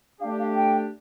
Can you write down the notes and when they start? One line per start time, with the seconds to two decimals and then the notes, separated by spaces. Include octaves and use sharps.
0.20 A3 D4 G4 F5
0.39 F5
0.55 G5